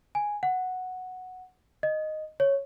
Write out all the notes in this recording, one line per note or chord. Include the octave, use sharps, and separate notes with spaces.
G#5
F#5
D#5
C#5